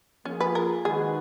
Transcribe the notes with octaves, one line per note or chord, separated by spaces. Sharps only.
F3 A#3 C#4 F4 G#4
B4
A#4
D#3 G#3 D#4 F#4 G#4 B4